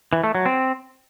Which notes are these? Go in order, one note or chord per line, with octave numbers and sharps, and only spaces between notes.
E3
A3
F#3
C4